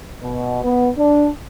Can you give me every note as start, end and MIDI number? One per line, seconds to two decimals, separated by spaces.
0.22 0.60 47
0.62 0.89 59
0.98 1.28 62